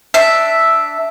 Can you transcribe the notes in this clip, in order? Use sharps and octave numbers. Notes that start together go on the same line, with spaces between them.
D4 E5